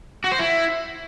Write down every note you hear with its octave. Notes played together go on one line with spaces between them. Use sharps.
F#4
C5
E4